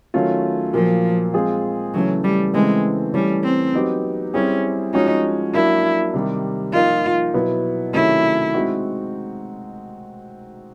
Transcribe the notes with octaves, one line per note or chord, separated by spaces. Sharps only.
D#3 F#3 A3 C#4 F4
A#2 F3 F#3 A#3
G#3 C4 F4 G#4
C#3 E3 F#3 A3 C#4
G3
C#3 E3 G#3 A3 C4
E3 G3 A3 C#4
C4
F#3 B3 D#4 G4
G3 C4 C#4 E4 G#4
F3 G#3 C#4 D#4 F#4
F#3 A#3 D4 E4
C3 D#3 G3
F3 A#3 D#4 F4
B2 F#3 B3 E4
C3 D#3 F#3 A3 C#4 E4
G#3 C4 D#4 F#4